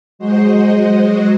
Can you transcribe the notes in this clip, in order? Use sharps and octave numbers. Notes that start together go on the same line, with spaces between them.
F#3 G#3 F#4 C5 D#5